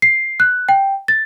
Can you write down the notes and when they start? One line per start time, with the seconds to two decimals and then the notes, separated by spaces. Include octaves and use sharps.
0.02 C7
0.40 F#6
0.69 G5
1.08 A6